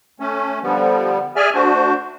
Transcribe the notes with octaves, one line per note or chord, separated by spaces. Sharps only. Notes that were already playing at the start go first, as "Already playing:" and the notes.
A3 C#4
D3 F3 G3 B3
G#4 D5 E5 G#5 F6
A3 D4 F#4 C5